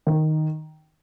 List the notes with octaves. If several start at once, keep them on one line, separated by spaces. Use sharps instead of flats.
D#3